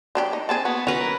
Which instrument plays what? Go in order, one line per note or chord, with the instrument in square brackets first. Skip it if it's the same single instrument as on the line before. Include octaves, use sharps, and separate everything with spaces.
[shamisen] F#3 D4 G4
D#4
[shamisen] A#3 C4 G#4 [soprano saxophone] A5
[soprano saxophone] B3 [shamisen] F#4
[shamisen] F#3 [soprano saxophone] C#4 [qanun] B4 A#5
[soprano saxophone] A#4